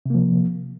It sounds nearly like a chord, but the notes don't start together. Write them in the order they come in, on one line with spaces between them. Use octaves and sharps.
C3 A#3 F3